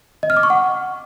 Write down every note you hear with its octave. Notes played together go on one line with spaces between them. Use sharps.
D#5
F6
D6
C#6
F#5